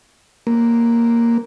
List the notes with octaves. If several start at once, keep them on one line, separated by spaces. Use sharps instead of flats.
A#3